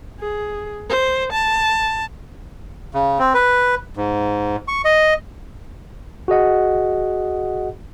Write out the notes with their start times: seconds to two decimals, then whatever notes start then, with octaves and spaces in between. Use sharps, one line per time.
0.20 G#4
0.90 C5
1.33 A5
2.94 C#3
3.19 C4
3.34 B4
3.97 G#2
4.68 C#6
4.85 D#5
6.28 F#4 G#4 D#5 F#5